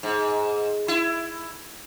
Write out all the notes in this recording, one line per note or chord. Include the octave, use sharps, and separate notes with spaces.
G#2
E4